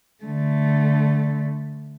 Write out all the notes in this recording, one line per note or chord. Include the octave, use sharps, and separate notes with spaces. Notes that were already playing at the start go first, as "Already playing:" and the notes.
D3 A3